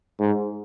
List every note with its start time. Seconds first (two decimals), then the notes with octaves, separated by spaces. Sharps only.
0.20 G#2